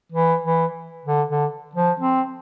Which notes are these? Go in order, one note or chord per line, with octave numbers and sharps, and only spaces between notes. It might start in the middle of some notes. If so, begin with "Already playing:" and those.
E3
E3
D3
D3
F3
C4